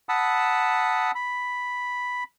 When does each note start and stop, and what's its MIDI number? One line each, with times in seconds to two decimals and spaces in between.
0.09 1.11 78
0.09 1.11 81
0.09 1.11 83
0.09 1.11 87
0.09 1.11 88
1.15 2.24 83